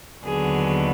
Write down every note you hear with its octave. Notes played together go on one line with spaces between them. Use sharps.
D#2 D3 F#3 B3 G#4